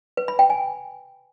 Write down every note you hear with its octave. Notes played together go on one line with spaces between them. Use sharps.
B4
B5
G5
G#5